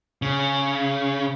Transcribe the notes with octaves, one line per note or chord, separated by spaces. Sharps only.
C#3